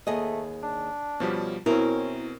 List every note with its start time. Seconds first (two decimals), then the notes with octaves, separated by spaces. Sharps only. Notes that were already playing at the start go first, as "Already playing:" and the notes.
0.07 D#2 A3 G#4 D#5
0.63 D4
1.20 B2 F3 G3 C#4
1.66 B2 C4 C#4 E4 A#4